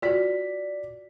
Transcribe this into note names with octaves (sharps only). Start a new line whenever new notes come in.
F4 F#4 D5 B6